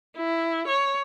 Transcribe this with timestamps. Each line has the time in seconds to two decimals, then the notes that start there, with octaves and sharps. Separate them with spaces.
0.17 E4
0.68 C#5